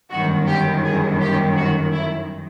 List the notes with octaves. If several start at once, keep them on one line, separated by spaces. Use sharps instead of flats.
G1 F#2 D#3 F#4
G4
G#4
G4
F#4
E4